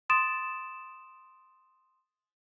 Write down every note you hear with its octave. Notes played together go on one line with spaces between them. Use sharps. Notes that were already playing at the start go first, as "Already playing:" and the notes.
C6 D#6 A6 D7 E7